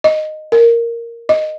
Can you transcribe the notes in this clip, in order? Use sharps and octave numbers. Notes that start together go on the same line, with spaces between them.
D#5
A#4
D#5